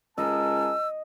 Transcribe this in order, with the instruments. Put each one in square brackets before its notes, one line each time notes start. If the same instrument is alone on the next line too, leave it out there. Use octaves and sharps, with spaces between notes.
[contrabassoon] C#2 [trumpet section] G#4 A#4 A5 [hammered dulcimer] D#5 [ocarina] E6